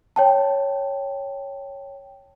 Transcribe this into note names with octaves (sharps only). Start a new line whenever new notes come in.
C#5 G5 A5